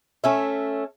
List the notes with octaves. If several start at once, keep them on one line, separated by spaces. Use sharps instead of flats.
A3 C#4 E5